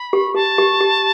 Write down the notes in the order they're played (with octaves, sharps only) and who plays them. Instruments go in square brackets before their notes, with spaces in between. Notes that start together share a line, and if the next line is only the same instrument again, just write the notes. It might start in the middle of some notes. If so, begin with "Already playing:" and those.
Already playing: [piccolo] B5
[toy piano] G4
[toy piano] G4 [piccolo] A5
[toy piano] G4
G4